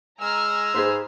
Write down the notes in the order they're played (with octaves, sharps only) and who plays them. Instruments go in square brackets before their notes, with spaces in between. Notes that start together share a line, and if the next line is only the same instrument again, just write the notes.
[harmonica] G#3 E6 [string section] G#5 A#5 F6
[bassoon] G#2 [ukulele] G#4 B4 C5